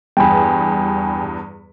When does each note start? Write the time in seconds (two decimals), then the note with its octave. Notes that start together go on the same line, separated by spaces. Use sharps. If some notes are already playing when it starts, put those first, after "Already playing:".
0.17 E2 G2 G5 G#5 B5